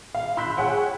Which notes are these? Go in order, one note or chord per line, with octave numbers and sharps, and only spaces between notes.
F5
B5 C6 E6 F#6 G6 B6
G#4 C#5 F#5 G5